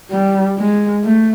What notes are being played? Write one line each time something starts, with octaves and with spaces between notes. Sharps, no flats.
G3
G#3
A3